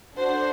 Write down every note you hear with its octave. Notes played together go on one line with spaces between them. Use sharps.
D4 F#4 A4 C5